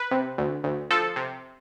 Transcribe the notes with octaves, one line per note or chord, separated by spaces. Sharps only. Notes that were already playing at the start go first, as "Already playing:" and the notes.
Already playing: B4
C3
D2
D2
F3 A4
C3